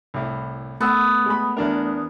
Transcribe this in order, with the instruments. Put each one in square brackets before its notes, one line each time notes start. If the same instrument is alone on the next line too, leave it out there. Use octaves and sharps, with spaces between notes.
[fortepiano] C2 A2
[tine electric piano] A3 [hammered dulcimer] B3 [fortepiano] F#5 E6
[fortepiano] G#3 B5
E2 D4 A#4